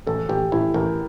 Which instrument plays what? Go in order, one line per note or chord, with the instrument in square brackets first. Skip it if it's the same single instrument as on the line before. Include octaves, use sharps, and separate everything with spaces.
[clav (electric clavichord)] A1 [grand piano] A4
[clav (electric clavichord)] A1 [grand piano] G4
[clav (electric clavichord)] A1 [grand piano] E4
[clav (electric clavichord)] A1 [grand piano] A#4